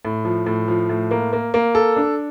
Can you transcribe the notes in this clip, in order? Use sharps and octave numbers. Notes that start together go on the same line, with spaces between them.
A2
F3
A2
F3
A2
A#3
A#3
A#3
A4
D4